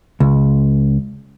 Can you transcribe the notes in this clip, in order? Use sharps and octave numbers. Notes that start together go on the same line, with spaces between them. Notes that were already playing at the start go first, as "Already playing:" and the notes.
C#2